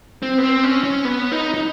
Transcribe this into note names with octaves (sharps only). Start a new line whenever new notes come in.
C4
B3
C4
C#4
C#4
B3
D#4
D#4